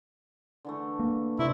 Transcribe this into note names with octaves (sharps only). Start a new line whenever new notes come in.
D3 E3 A3
A#3
C3 A3 D4 E4 C5